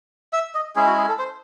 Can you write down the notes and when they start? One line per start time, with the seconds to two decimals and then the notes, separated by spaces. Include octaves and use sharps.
0.33 E5
0.55 D#5
0.75 G#3 C#4 E4 G#4
0.86 F#4
0.97 G#4
1.08 A4
1.19 C5